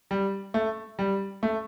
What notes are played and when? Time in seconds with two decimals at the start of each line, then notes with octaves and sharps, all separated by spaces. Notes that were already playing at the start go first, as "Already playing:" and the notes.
0.11 G3
0.54 A3
0.99 G3
1.43 A3